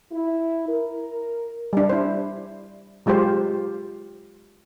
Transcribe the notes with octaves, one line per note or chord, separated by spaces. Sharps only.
E4
A#4
G3 D4
E4 C5
F#3 G#3 F4 G4 C5